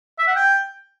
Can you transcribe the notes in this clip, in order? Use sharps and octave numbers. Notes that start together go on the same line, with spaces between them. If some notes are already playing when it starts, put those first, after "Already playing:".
E5
F#5
G5